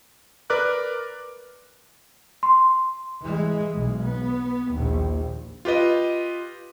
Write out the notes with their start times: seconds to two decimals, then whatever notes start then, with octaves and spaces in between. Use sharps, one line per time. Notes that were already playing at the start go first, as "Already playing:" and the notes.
0.50 A#4 B4 D5 D6 F#6
2.43 C6
3.22 E3 G#3
3.75 B1 G#3
4.04 B3
4.72 A#1 D#2
5.65 F4 G4 B4 D#5